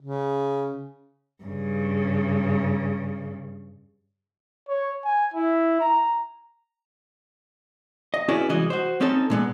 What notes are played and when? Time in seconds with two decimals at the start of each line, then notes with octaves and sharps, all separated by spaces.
0.01 C#3
1.43 G2 C#3
4.69 C#5
5.04 G#5
5.34 E4
5.81 A#5
8.14 D#5
8.28 C#4 E4 F#4 G#4 B4 D5
8.49 C2 E3 G#3 F#4 D#5
8.70 F#4 C5
9.01 C4 C#4 D#4 A4
9.30 A#2 G#3 B3